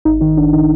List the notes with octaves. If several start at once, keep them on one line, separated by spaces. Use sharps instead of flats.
G#1 D#4
D#3 D#4
G#1 D4
D#3 D#4